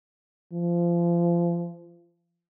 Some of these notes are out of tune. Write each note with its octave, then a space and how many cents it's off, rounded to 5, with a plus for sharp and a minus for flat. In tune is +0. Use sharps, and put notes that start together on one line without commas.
F3 -25